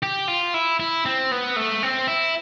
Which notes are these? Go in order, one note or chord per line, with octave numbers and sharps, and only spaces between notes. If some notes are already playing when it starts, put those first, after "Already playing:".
G4
F4
E4
E4
C4
B3
A3
C4
E4